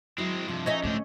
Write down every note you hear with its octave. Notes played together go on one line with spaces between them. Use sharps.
F#3 G#3 C4 E4
G2 C3 F3 G#3
C#4 D#4 D#5 E5
G#2 D3 A3 C4